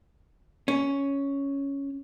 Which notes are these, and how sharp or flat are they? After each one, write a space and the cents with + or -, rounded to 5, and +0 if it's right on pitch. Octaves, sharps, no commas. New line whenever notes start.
C#4 +5